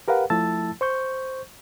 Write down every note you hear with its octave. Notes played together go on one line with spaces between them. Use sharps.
G4 A#4 B4 F5 F#5
F3 A3 E4 A5 E6 A6
C5 C#6 G6